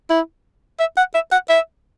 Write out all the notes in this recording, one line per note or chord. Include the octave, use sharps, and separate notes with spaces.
E4
E5
F#5
E5
F#5
E5